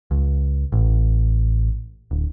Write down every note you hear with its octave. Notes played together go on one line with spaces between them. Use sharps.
C#2
A1
D1